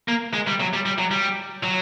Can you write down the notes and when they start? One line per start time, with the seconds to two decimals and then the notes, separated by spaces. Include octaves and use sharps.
0.08 A#3
0.34 G#3
0.47 G3
0.60 F#3
0.73 G3
0.86 G3
0.98 F#3
1.11 G3
1.63 F#3